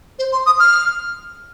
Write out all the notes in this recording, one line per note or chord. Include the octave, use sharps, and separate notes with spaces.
C5
C6
D#6
F6